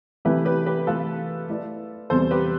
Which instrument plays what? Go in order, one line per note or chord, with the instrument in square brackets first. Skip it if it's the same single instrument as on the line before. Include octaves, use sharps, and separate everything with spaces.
[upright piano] C3 E3 A3 E4 [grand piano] G4 B4
[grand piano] G4 B4
G4 B4
[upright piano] C3 E3 A3 [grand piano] F4 A4
[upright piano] A3 E4 B4 D5
[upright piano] E2 C3 G3 [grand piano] A4 C5
[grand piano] G4 B4